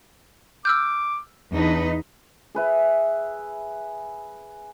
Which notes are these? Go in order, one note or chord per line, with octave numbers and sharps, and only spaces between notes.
D6 E6 F6 G6
E2 D4 D#4 B4
G#4 B4 E5